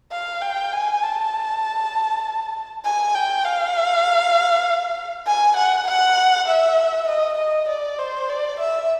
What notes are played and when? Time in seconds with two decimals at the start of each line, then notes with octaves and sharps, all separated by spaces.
0.12 F5
0.42 G5
0.72 G#5
1.03 A5
2.85 G#5
3.15 G5
3.44 F5
5.26 G#5
5.57 F#5
5.87 F#5
6.48 E5
7.08 D#5
7.38 D#5
7.69 D5
7.99 C5
8.29 D5
8.60 E5